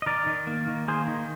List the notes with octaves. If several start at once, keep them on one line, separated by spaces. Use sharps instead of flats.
D#5
D#3 A#4 D5
D#3
A#3
D#3
A#3 G#4 C5
D#3